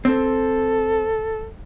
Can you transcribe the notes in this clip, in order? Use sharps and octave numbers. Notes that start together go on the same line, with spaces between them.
C4 A4